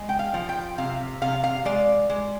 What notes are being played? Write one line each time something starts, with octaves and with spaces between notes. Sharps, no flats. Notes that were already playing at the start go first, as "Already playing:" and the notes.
Already playing: G#3
G5
F5
F3
G5
C3 F5
C3 F5
F5
G#3 D5
G#3